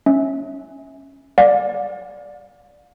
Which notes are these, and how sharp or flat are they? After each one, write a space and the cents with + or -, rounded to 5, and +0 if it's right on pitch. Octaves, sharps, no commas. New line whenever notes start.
C#4 -10 E5 -20
D5 +0 F5 +40